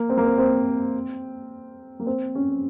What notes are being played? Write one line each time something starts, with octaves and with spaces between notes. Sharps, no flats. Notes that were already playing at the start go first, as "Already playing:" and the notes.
Already playing: A#3
C4
A#3
C4
C4
A#3
C4
C#4